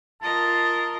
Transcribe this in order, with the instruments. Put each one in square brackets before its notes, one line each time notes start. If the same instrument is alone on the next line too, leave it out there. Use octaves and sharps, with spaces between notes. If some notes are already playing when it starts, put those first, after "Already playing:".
[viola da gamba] F4 A#4 D#5 [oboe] A5